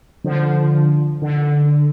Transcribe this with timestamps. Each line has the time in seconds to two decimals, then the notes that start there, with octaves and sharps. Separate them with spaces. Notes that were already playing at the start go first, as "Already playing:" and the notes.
0.24 D3 F3
1.22 D3